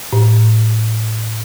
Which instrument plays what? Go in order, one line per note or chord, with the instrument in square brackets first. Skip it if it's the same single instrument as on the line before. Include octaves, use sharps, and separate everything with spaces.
[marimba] A2